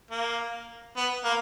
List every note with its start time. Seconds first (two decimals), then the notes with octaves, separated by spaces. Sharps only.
0.11 A#3
0.97 B3
1.24 A#3